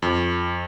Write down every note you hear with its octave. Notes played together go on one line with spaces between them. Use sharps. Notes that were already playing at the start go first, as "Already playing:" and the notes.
F2